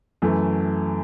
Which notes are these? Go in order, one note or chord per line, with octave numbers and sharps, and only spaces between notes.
F#2 E3 A3